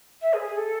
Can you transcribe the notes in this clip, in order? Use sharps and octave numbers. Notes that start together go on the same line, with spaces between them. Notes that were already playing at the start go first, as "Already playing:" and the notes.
E5
G#4
G#4
A4